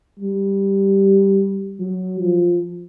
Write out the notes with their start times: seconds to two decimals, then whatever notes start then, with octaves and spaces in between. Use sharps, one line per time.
0.20 G3
1.80 F#3
2.20 F3